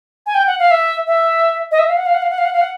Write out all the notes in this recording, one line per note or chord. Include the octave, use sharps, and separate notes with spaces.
G#5
G5
F#5
F5
E5
E5
D#5
E5
F5
F#5
F5
F#5
F5
F#5
F5
F#5
F5
F#5